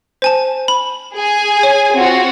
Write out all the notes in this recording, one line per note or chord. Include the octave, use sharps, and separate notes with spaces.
C5 G#5 A5
B5
G#4 G#5
C#5
C4 F4 F#4